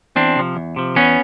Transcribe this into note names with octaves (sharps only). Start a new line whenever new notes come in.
E2 C4 D4
C3 F3
E2
C3 F3
E2 B3 C#4